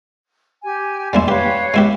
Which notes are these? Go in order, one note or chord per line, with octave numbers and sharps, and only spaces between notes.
G4 G#5
G3 A#3 E4 C6
G4 B4 C#5 F5
G#3 E4 G4